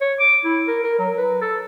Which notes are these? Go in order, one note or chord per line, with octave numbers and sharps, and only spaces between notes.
C#5
D6
E4
A#4
A#4
F#3
B4
A4